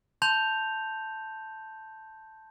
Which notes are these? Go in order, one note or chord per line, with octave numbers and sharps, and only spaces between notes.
A5 C6 G6 F7